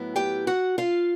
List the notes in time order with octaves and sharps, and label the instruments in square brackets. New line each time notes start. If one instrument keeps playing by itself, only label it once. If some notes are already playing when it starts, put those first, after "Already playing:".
Already playing: [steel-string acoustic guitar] A2 F#3 B3 E4
G4 G5
F#4 F#5
F4 F5